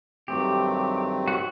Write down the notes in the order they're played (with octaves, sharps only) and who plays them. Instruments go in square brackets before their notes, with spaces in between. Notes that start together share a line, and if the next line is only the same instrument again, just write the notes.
[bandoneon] G2 D#3 F#3 A3 C4 [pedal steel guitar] G4
[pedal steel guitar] F#4